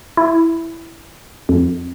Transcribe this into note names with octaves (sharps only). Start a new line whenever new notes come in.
E4
F2